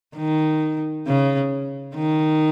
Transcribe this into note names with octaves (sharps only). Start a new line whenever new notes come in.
D#3
C#3
D#3